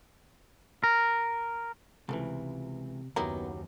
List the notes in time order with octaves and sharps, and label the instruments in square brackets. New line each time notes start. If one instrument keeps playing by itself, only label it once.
[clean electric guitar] A#4
[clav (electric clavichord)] C#2 E3 [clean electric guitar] C3 [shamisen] F3 A3
[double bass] F#1 D#2 [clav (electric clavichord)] F#3 G4 [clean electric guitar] B3 [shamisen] D#4 E4 A#4